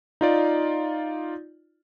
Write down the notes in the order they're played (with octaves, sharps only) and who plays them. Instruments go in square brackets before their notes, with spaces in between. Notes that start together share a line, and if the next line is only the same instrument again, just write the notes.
[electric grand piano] D#4 F4 D5